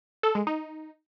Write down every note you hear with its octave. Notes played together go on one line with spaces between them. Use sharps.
A4
G#3
D#4